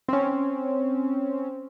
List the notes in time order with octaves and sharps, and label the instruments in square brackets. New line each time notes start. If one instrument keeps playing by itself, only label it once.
[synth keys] C4 C#4